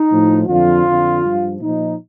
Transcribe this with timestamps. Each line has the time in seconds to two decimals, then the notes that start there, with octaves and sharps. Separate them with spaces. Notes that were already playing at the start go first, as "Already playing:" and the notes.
Already playing: D#4
0.10 A2 F3
0.48 F2 D3 F3 F4
0.86 F2 D3 F3
1.23 G2 F3
1.61 A#2 F3 D#4